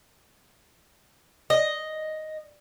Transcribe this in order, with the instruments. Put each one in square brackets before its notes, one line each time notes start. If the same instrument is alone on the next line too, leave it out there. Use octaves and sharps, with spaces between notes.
[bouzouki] D#5